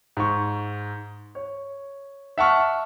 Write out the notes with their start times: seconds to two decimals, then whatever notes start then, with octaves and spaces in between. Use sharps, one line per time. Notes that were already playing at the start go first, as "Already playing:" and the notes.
0.17 G#2 C#6
1.35 C#5
2.38 E5 F#5 A5 C#6 F6